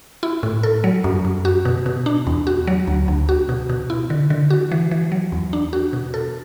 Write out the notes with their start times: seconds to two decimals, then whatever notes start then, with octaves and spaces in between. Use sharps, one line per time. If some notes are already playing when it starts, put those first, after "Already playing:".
0.23 E4
0.43 A2
0.63 A4
0.84 F#3
1.04 F#2
1.25 F#2
1.45 F#4
1.65 B2
1.86 B2
2.06 D4
2.27 E2
2.47 F#4
2.67 F#3
2.87 D2
3.08 D2
3.29 F#4
3.49 B2
3.69 B2
3.90 E4
4.10 D3
4.30 D3
4.50 F#4
4.72 E3
4.91 E3
5.12 F#3
5.32 E2
5.53 D4
5.73 F#4
5.93 B2
6.14 A4